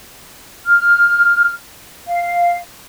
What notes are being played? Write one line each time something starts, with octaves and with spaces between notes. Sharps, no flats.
F6
F5